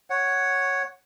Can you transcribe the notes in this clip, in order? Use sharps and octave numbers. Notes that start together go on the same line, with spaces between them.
C#5 F#5